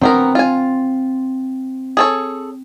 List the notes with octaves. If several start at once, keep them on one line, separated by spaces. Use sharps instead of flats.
F#3 B3 C4 A#4
F4 G#5
G#4 A4 C#5